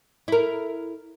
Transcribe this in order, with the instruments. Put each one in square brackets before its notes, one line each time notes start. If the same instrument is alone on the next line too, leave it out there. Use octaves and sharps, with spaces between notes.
[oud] E4 A#4